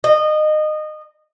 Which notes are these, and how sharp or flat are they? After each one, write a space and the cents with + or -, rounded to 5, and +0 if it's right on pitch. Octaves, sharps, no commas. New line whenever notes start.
D#5 -20